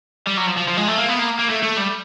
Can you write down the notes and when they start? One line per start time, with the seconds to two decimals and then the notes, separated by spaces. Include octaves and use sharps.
0.27 G3
0.37 F#3
0.47 F3
0.57 F3
0.68 F3
0.77 G#3
0.88 A3
0.98 A#3
1.09 B3
1.19 A#3
1.39 A#3
1.49 A3
1.62 A3
1.77 G3